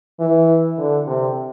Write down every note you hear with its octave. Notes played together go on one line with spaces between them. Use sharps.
E3
D3
C3